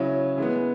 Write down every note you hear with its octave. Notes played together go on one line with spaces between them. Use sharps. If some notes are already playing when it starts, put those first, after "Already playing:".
Already playing: C#3 F#3 C#4 E4
E3 G#3 B3